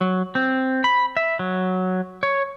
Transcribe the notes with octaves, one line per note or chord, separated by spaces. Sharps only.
F#3
C4
B5
E5
F#3
C#5